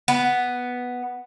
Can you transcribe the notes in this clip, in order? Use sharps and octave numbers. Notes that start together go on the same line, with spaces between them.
B3